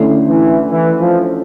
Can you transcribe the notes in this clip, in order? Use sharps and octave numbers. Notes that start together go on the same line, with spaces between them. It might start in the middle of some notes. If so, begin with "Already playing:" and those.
Already playing: D2 D3 A3 C#4 E4
E3
E3
F3